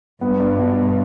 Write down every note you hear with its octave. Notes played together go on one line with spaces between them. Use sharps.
G2 B3
D4
B2